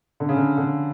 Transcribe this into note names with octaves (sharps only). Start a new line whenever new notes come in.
D3
C#3
D3
D3
C#3